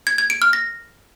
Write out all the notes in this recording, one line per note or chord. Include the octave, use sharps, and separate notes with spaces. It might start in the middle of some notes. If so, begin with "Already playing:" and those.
G#6
G#6
D7
F6
A#6